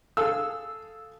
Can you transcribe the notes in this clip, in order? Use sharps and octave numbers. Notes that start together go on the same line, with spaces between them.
G#4 A4 F5 E6